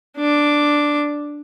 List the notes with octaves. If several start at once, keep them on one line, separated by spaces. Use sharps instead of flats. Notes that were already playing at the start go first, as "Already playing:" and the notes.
D4 D6